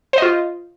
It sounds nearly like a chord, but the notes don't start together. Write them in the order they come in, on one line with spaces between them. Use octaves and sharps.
C5 D#5 F4